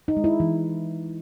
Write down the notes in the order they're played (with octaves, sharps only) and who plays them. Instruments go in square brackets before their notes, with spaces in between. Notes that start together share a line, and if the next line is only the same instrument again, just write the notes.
[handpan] D#4
G#3
E4
E3